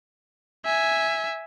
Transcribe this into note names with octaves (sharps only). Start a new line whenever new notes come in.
E5 G#5